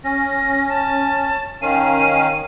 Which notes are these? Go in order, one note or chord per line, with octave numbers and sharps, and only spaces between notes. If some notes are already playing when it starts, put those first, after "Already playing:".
C#4 A#6
A5
D#3 C#4 F5 D#7